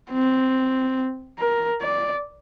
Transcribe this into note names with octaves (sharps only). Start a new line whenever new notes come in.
C4
A#4
D5